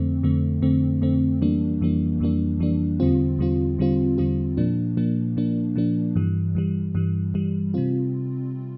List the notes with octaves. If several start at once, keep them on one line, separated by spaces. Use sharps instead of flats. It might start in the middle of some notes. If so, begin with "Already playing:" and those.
Already playing: F2 D3 A3 C4
F2 D3 A3 C4
F2 D3 A3 C4
F2 D3 A3 C4
F2 E3 G3 A#3 D4
F2 E3 G3 A#3 D4
F2 E3 G3 A#3 D4
F2 E3 G3 A#3 D4
E2 D3 G3 C4 F4
E2 D3 G3 C4 F4
E2 D3 G3 C4 F4
E2 D3 G3 C4 F4
A#2 F3 A#3 D4
A#2 F3 A#3 D4
A#2 F3 A#3 D4
A#2 F3 A#3 D4
G2 E3 G3
G2 E3 G3
G2 E3 G3
G2 E3 G3
C3 G3 C4 F4